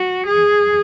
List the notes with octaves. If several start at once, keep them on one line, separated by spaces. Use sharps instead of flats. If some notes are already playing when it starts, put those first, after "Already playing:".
Already playing: F#4
G#4